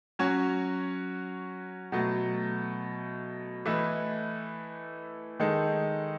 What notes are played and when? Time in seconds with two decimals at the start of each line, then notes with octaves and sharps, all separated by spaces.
0.19 F#3 C#4 F#4 C#5
1.92 B2 F#3 A3
3.65 E3 A3 E4 B4 D#5
5.40 D#3 G#3 D#4 A4